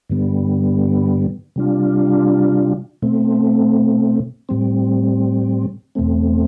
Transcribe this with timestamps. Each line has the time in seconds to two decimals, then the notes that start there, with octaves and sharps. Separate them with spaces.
0.09 G2 D3 G3 B3
1.56 C3 G3 D4 F4
3.02 B2 A3 C4
4.49 A2 G3 C4
5.95 E2 B2 A3 C4